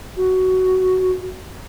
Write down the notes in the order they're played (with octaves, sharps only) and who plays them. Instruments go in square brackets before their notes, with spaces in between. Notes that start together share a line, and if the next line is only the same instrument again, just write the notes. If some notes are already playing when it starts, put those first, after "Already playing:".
[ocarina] F#4